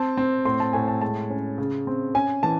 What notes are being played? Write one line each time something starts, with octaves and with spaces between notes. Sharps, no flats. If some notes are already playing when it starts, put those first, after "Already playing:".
Already playing: C4 A5
C4
A2 C6
A5
A2 G#5
A5
G#3 A5
C#4
C#3
C4
C#4 G#5
E3 A5